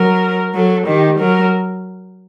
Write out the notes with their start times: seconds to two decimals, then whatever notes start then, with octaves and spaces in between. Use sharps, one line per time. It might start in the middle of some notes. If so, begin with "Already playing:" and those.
Already playing: F#3 A#4
0.54 F#3 A4
0.87 D#3 G4
1.19 F#3 A#4